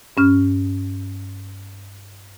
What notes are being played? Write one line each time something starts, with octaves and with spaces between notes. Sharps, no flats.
G2 C#4 F6